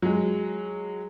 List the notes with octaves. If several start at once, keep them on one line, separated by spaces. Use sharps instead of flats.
F#3 G#3